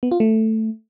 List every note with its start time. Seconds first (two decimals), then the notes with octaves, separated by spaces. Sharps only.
0.03 B3
0.11 F4
0.20 A3